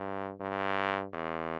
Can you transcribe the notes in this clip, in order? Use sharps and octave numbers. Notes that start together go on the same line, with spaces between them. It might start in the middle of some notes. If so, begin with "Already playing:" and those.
Already playing: G2
G2
E2